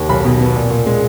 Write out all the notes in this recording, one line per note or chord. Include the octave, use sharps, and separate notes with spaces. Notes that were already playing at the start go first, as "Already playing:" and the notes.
Already playing: D#2
B1 B5
B2
B3
A#2
A#2
G#3